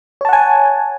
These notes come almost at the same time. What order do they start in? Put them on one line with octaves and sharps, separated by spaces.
C#5 A5 F#5 G#5